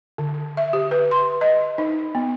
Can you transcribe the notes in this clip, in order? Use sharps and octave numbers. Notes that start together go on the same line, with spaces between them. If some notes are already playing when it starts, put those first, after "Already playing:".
D3
E5
G4
B4
C6
D#5
D#4
B3